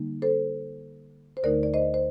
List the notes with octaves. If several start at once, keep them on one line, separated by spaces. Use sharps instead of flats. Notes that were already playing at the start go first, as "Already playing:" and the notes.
Already playing: D3 G3 A#3 D#4
A4 C5
C5
D2 D3 A3 D#4 A#4 D5
D5
C5 D#5
C5